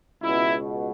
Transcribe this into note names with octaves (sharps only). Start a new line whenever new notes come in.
C#2 B2 E4